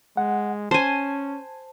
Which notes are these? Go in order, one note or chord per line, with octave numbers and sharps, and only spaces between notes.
G#3 F#5
C#4 C5 G#5 A5